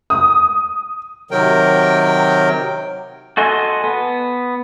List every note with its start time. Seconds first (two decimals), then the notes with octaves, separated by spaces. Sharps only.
0.10 D#6
1.31 C3 D#3 F#3 A#4 G5
3.37 F#4 A4 D#5 G#5 C6
3.84 B3